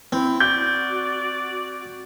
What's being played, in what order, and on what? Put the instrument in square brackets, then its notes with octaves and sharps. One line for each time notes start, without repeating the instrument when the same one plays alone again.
[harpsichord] C4 [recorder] E4
[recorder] F#4 [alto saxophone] D5 [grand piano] G6